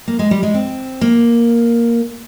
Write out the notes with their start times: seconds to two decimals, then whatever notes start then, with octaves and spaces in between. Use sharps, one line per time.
0.08 A#3
0.19 G#3
0.31 G3
0.43 G#3
0.54 C4
1.01 A#3